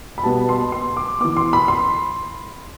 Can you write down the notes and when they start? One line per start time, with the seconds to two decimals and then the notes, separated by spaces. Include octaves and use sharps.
0.18 B5
0.24 B2 G3 B3 A5
0.49 C6
0.72 C6
0.97 D6
1.20 E3 B3 D6
1.37 C6
1.53 B5
1.68 C6